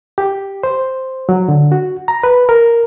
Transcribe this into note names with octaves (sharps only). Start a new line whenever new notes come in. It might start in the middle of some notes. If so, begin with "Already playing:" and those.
G4
C5
F#3
D3
F#4
A#5
B4
A#4